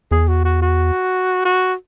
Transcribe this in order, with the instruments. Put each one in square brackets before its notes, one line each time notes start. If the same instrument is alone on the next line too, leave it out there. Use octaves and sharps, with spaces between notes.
[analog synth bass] E2 [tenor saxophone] G#4
[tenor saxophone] F#4
F#4
F#4
F#4